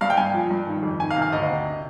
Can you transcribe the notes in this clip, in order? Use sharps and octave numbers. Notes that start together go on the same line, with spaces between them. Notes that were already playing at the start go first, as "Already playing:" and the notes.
G2 F5
G5
G2 G#5
F3
G2
D#3
F2
D#3 G#5
F5
C3
F5
D2 D#5
C3